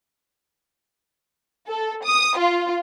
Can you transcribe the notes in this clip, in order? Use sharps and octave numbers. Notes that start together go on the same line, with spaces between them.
A4
D#6
F4